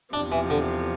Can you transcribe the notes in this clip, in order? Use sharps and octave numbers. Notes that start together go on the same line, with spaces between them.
E2 C3 F3 D4
E3
D3